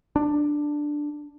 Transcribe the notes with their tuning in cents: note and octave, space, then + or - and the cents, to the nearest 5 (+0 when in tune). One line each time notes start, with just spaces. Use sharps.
D4 +5